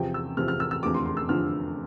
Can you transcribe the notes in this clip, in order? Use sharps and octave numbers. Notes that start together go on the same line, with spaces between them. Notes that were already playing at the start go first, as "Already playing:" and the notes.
Already playing: E2 C3 F3 G5
E6
E2 C3 F3 F6
F6
E6
E6
F1 E2 D3 F3 D6
C6
C6
E6
F1 E2 D3 F3 F6